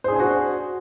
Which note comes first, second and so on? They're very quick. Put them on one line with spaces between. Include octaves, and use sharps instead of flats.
C5 G#4 D4 G#5 F#4